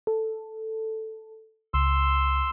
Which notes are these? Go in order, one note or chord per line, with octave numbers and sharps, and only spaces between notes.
A4
C#2 C6 E6